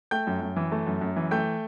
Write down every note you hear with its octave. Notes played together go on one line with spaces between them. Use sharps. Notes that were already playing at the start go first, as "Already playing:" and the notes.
A3 G5 G6
F#2
F#2
E3
A3
F#2
F#2
E3
A3 G5 G6